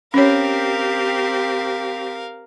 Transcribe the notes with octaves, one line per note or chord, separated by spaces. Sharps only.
C4 C#4 G4 A#4 C#5 F5